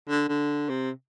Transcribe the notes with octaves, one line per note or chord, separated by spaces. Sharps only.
D3
D3
C3